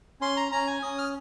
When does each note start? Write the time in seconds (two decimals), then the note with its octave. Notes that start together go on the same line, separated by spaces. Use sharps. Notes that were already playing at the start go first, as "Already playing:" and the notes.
0.21 C#4 C6
0.37 A#5
0.52 C#4 A#5
0.67 G#5
0.82 C#4 D#6
0.98 F6